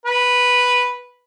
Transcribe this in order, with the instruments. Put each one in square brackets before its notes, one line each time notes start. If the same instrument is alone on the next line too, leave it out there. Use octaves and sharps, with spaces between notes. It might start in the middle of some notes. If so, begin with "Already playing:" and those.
[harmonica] B4